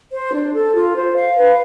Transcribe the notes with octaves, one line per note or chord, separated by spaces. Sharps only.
C5
D4
A4
F4
C5
F5
B4